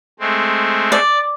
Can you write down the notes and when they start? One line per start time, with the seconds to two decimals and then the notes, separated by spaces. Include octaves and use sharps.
0.20 G#3 A3 C4
0.92 D5